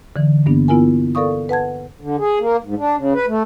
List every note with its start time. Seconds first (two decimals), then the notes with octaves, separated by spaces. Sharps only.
0.16 D3 E3
0.46 G2 A#3 B3 D4
0.68 B3 E4 F4 A#4 G#5
1.15 A4 A#4 D5 F5 C#6 D#6
1.49 B4 F#5 A5 G#6
2.01 D3
2.19 G#4
2.39 A#3
2.64 G#2
2.78 D4
2.97 C#3
3.13 B4
3.27 A3